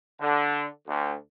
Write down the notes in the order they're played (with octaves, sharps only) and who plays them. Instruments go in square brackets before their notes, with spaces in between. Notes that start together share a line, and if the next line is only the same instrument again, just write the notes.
[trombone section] D3
D2